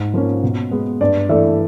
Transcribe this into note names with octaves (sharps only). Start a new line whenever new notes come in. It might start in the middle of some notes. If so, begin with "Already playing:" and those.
Already playing: G#2
F3 A#3 C#4
B2
G#3 B3
G2 D5
E3 A3 D5 E5